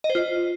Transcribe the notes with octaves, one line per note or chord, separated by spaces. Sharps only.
D#5
C5
F4